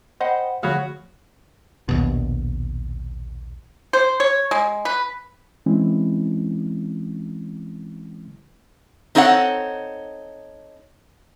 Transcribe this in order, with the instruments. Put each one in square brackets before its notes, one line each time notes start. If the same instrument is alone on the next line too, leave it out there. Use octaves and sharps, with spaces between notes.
[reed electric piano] C5 G5 B5 [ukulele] D#5 F#5
[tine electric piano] D3 F3 A3 [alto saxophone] F#4 [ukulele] G#4 C#5 [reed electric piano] F5 B5
[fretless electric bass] A#1 D#2 B2
[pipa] C5
C#5
G#3
B4
[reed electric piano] E3 G#3 C4 C#4 E4
[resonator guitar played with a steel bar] C4 D#4 A4 C#5 D5 F#5